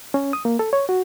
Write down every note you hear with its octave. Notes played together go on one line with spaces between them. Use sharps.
C#4
D#6
A#3
A4
C#5
F#4